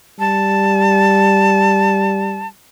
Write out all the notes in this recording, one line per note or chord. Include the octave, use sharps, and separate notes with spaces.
G3 A5